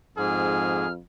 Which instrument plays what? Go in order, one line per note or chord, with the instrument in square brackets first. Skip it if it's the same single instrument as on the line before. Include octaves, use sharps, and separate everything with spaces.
[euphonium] F2 [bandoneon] G#2 [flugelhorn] G#4 [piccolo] F6